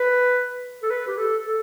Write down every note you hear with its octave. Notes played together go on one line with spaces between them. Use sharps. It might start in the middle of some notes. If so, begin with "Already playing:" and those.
Already playing: B4
A4
B4
G4
A4
A4